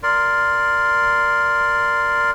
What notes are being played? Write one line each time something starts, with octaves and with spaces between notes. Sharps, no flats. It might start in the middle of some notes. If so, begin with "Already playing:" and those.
A#4 D5 C6